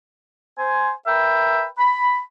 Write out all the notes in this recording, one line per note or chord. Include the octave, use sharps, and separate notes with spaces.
C5 G#5
A#4 B4 E5 G5
B5